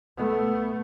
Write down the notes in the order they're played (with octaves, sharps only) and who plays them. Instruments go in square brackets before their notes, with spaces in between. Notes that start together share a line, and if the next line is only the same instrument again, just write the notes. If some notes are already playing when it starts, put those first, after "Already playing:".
[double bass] A3 B3